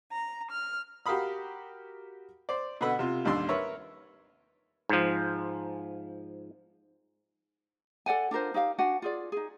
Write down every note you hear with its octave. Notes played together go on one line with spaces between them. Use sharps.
A#5
F6
F#4 G4 A#4 F5 B5 D#6
C5 D5
B2 D3 B4 F#5 B5 E6
C3 F4
A1 D#2 G3 D4 C6 E6
A#4 B4 C#5 E5 A#5
G#2 F3
A4 D5 F#5 G#5
D4 F4 A#4 C5
D#4 G4 E5 F5
D4 F#4 F#5 G#5
F4 G#4 D5
D#4 G#4